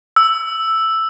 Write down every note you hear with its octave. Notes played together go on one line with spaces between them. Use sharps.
E6